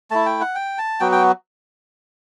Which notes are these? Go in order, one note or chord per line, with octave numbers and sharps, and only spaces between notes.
A3 E4 A5
G5
F#5
G5
A5
F#3 B3 F#4 G5
G5